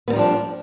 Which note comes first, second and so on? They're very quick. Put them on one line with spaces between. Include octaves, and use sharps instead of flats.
B3 G3 D#4 F3 D4